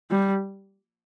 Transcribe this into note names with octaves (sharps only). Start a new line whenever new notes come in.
G3